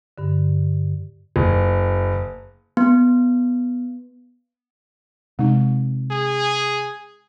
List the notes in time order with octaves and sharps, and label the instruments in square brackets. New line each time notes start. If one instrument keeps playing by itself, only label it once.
[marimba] G2 D3
[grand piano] F#1
[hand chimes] B3
[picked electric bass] C3 [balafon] G#3 D#4
[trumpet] G#4